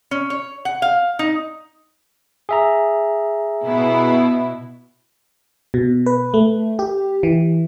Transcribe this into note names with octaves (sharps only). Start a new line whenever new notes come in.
C#4
C#5
F#5
F5
D#4
G#4 E5 A#5
B2 B3 E4
B2
B4
A3
G4
E3